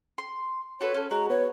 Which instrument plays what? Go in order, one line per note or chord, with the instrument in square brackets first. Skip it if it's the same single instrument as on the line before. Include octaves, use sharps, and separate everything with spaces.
[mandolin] C6
[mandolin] F#4 A4 B4 [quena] C#5
[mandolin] C#4 A4
[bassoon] G#3 [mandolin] F#4 [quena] A#5
[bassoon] B3 [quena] C#5